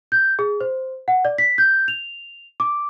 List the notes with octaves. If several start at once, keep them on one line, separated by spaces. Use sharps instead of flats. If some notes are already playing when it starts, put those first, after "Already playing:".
G6
G#4
C5
F#5
D5
B6
G6
F7
D6